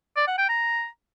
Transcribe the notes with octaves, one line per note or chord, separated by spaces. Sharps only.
D5
F#5
G5
A#5